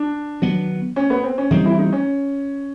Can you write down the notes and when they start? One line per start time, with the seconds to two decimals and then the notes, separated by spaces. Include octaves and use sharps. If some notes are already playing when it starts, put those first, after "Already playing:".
Already playing: D4
0.42 D#3 F#3 B3
0.96 C#4
1.10 B3
1.24 C4
1.38 C#4
1.51 E3 G3 C4 D#4
1.65 E4
1.79 D#4
1.93 C#4